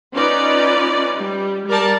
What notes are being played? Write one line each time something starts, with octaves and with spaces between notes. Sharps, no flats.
C#4 D#4 F4 B4 D5
G3
G3 A#4 D5 A5